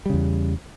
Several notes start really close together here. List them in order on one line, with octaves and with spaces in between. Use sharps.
G3 C#3 E2